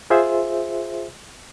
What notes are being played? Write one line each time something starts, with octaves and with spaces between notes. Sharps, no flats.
F4 G#4 C5 E5